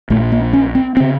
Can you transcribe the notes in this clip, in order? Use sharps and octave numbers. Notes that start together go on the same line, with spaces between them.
A#1 A#2 A3
A#3
C#4
C4
C#3 C4